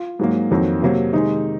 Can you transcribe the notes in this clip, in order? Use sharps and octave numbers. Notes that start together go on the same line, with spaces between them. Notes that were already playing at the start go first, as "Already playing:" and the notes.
Already playing: F4
G#2 F#3 A#3
F2 D#3 F#3 A#3
C3 F#3 A#3
C3 D#3 G#3 D#4